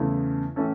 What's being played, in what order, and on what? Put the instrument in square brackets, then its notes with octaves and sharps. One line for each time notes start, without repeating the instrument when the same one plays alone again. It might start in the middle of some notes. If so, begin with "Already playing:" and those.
Already playing: [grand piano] E2 C#3 A3 E4
A2 E3 C#4 A4